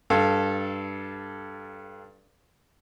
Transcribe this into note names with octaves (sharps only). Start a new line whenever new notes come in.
G2 A4 F5